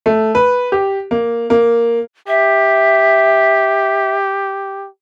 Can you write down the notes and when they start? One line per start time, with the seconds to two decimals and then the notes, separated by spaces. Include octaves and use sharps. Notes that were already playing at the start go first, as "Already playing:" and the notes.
0.06 A3
0.35 B4
0.72 G4
1.11 A#3
1.50 A#3
2.28 G4 E5